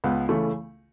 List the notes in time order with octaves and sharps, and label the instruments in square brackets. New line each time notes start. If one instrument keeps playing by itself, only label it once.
[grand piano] C#2 B3
C#3 E3 A3